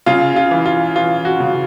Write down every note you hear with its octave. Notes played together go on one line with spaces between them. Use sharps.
C#3 F4
F4
E3
F4
E3 F4
F#4
C#3